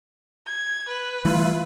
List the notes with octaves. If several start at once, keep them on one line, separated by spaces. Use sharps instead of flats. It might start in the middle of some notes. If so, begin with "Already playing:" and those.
G#6
B4
E3 G3 A3 E4 F4